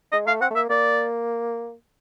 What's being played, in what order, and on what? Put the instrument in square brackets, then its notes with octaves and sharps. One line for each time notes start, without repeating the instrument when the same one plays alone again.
[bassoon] G#3 [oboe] D#5
[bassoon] A3 [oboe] F5
[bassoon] C4 [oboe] F#5
[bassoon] A3
[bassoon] A#3 [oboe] E5
[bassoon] A#3 [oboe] D5